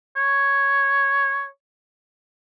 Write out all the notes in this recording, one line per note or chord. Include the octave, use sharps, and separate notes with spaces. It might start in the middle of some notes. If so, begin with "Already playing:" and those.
C#5